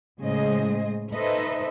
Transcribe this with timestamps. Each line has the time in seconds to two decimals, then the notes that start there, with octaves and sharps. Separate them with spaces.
0.19 A2 C#3 G#3 G#4 C5 D#5
1.13 D#4 A4 B4 C5 D#5 E5